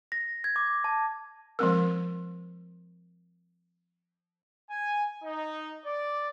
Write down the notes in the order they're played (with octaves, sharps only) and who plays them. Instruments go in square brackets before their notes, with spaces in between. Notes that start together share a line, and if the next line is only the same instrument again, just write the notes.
[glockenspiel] A#6
G#6
D6
A5
[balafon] F3 G#3 C4 A#4
[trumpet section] G#5
D#4
D5